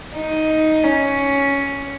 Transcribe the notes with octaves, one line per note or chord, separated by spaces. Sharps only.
D#4
C#4